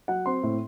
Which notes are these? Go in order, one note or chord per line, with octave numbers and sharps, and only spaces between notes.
F#3 F#5
C4 C6
A2